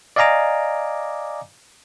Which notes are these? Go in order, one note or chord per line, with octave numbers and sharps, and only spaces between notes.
D5 D#5 F5 G#5 A#5 D6